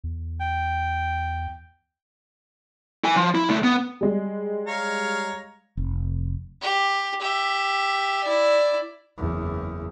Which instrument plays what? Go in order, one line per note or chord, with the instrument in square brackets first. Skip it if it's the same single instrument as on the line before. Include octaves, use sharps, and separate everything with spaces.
[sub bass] E2
[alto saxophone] G5
[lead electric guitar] E4 G#5
F3
E4
C#2 A3
B3
[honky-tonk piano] G3 G#3
[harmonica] C#5 F5 A#5
[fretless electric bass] F1
[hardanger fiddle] G4
G4 E5
E4 D5
[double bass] F#1 E2